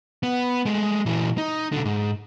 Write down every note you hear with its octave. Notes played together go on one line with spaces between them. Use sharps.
B3
G#3 A3
A#2 E3
D#4
B1 D3
G#2